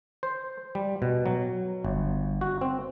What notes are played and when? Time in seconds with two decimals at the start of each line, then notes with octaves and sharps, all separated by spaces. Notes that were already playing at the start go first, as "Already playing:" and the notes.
0.23 C5
0.75 G3
1.02 B2
1.26 F#3
1.85 G1
2.41 F#4
2.61 C4